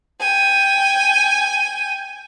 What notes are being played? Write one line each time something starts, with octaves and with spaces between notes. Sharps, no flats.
G5 G#5